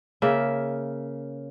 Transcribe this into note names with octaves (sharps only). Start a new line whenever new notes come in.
C#3 A#3 E5